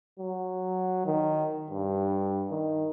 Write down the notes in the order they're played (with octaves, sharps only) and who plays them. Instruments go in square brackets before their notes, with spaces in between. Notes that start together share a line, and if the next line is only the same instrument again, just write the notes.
[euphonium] F#3
D#3
G2
D#3